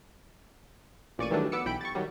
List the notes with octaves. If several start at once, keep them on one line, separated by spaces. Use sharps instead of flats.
A1 A#2 D5 C#6 D#7
D#3 E3 F#3 G3 A3 D4
B3 D6 E6 C#7
B1 E3 G5 B5 D7
C#6 A6
D#3 F#3 G3